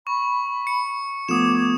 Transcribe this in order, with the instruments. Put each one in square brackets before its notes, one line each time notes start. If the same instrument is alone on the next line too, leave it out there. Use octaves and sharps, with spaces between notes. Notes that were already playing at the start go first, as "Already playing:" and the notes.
[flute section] B5 [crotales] C#6
[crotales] C#7
[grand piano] F3 A3 B3 [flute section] D6 G#6 [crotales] D#6 E7